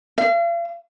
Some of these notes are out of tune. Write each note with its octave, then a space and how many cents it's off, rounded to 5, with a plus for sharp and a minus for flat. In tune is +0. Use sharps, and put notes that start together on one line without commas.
F5 -40